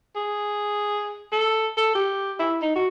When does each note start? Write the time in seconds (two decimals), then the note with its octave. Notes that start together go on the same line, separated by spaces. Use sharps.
0.16 G#4
1.32 A4
1.77 A4
1.95 G4
2.39 E4
2.62 D#4
2.76 F#4